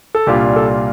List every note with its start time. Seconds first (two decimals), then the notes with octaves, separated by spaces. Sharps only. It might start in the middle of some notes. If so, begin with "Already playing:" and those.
0.15 A4
0.26 C2 A#2 G3 D4 F4 G4
0.56 A4